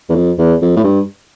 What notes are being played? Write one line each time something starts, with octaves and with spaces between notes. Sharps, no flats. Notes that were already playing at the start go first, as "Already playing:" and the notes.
E2
F2
E2
F2
A2
G2